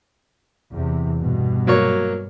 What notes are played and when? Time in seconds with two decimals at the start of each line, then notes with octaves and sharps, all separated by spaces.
0.71 E2 C3
1.20 G2 B2
1.67 F#3 A#3 C#5